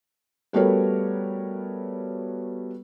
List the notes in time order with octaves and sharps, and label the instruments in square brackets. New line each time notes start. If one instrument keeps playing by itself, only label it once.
[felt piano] G3 A3 B3 F#4 A#4 C#5